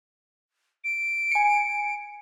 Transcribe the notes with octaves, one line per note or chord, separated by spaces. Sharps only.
D7
G#5 C#7